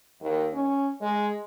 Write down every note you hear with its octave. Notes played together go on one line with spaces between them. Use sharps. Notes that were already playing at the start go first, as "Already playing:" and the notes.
D#2
C#4
G#3